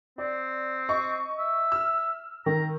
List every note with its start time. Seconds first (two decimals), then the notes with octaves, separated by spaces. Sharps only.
0.18 C4 D5
0.89 D#5 C#6
1.39 E5
1.72 E6 F6
2.46 D#3 A#5